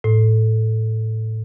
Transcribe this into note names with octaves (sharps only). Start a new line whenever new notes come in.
A2